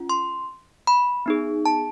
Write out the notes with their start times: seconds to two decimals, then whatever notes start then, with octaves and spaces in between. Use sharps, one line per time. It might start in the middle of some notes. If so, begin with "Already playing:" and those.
Already playing: C#4 F4
0.09 C6
0.87 B5
1.26 B3 D#4 G#4
1.66 A5